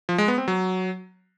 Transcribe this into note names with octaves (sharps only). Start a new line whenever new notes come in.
F3
G#3
B3
C4
F#3